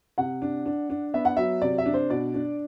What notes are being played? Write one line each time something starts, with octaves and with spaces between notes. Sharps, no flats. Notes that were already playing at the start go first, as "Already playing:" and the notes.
C3 F#5
D4
D4
D4
B3 E5
F#5
F#3 E5
C3 D5
E5
D4
C5
B2 D5
D4